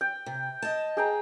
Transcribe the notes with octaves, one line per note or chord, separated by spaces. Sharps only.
G5
C3
D#5 A5
G#4 G5 A#5